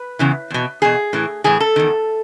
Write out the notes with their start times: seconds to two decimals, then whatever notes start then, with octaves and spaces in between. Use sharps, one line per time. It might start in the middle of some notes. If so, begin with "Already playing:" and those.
Already playing: B4
0.19 E2 C#3 E3
0.50 E2 B2
0.82 E2 B2 G#4
1.13 A2 E3
1.44 A2 E3 G#4
1.60 A4
1.76 E2 D#3